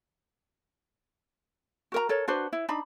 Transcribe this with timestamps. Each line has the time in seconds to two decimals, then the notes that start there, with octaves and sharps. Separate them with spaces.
1.92 F#4 A#4 A#5
2.09 A4 A#4 C#5
2.28 D4 F#4 B4 C5
2.53 E4
2.69 D4 D#4 B5